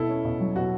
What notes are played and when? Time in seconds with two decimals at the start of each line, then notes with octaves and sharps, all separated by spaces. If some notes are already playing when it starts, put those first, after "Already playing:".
Already playing: B2 E4 A4
0.09 C#4
0.25 B2
0.40 F#3
0.56 B2 F#4